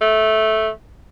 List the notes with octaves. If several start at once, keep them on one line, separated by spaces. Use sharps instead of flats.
A3